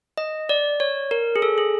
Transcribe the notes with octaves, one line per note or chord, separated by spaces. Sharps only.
D#5
D5
C#5
A#4
G#4
A4
G#4